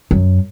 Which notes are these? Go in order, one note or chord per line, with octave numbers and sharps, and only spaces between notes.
F#2